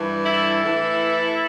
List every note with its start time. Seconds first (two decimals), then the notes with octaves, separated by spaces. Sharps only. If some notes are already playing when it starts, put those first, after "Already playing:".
Already playing: G2 E3
0.25 E4 A4
0.63 A2 E3